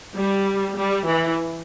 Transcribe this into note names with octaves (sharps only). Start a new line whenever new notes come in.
G3
G3
E3